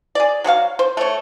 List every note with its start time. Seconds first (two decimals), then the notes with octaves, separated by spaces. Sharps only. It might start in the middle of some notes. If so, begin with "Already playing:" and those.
0.15 G#4 D5
0.44 F#3 F#4 G#4 F5
0.79 C5
0.97 A3 C#5